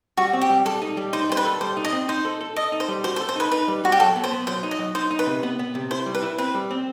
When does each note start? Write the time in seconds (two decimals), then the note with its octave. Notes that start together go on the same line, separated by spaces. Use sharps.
0.17 G3 F#4
0.33 C4
0.41 G4
0.50 G3
0.65 G3 A4
0.82 D#4
0.97 G3
1.13 D#4 C5
1.29 G3 C5
1.37 B4
1.45 A4
1.61 G3 C5
1.77 D#4
1.85 D#5
1.93 C4
2.08 D#4 C5
2.25 A4
2.41 A4
2.56 A4 D#5
2.72 D#4
2.80 C5
2.88 G3
3.04 F#4 C5
3.16 C5
3.20 A4
3.29 C5
3.36 D#4 B4
3.52 D#4 B4
3.68 G3
3.84 G3 F#4
3.92 G4
4.00 F#3 A4
4.16 B3
4.24 C5
4.31 B3
4.47 F#3 C5
4.63 D#4
4.71 D#5
4.79 F#3
4.95 D#4 C5
5.11 D#4
5.19 B4
5.27 C3
5.43 B3
5.59 B3
5.75 C3
5.91 E4 C5
6.06 G3
6.15 B4
6.23 E4
6.38 C4 B4
6.55 G3
6.71 C4